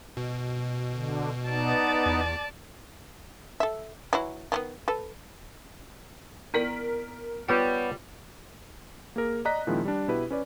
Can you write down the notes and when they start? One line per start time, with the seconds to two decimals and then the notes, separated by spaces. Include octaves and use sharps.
0.17 B2
0.93 D3
1.50 B3 D#4 D5 A5
2.06 E2
3.60 A4 E5
4.13 E3 F#3 E4
4.52 D#3 G3 B3
4.88 A4 B4
6.54 B3 E4 A#4 D5 B6 F#7
7.48 G3 B3 F4 C#5 F#5 G5
9.16 A#3 G#4 A#4
9.45 D5 D#5 A#5 F#6 B6
9.67 A#2 D#3 F3 G#3 C4 E4
9.85 G3 D4
10.08 B2 E4 G4 B4
10.31 C#4 B4 D5